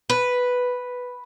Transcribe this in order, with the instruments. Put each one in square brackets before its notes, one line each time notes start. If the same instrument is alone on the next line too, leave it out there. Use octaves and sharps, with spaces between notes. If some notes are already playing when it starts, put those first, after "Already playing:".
[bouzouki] B4